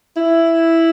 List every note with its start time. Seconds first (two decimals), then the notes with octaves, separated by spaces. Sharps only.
0.16 E4